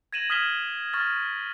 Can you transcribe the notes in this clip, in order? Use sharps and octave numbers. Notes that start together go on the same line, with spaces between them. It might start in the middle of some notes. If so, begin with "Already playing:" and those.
G#6 A#6 D#7 E7 F#7
D#6 F6 G#6 B6 E7 G7
C#6 F6 A6